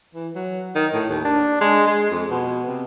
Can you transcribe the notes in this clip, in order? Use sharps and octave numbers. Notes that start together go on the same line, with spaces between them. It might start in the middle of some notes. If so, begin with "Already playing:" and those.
E3
F#3
D#3
A2
D#2
D4
G#3
G#3
F2
B2
C3